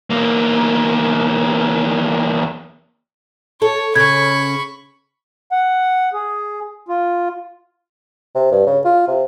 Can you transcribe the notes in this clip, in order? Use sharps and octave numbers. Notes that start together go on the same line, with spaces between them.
E2 A#3
A4 C#5
C#3 C#4 B5 C#6 G#6
F#5
G#4
F4
C3
G2
C#3
F4
C3